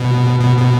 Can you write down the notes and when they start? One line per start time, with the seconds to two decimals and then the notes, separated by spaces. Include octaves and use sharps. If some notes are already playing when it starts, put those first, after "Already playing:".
Already playing: B2
0.40 B2
0.58 B2